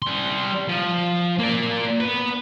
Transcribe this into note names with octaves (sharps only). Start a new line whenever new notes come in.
G3 C6
F3
A#3 D5
B3 B4